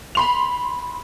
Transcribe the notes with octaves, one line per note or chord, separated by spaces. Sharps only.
B5 C6 F7